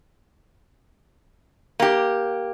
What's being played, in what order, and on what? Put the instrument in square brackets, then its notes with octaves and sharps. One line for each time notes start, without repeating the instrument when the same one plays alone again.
[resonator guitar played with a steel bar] A#3 G4